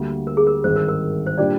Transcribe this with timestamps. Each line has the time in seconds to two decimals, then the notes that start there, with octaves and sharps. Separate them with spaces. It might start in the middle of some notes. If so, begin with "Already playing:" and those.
Already playing: D2 D3 G3 A#3
0.27 A#4
0.37 G#4
0.47 A#4
0.64 G#1 G2 D#3 C5
0.76 A#4
0.88 A#4
1.26 C5
1.38 A#2 G3 D4 G4 D5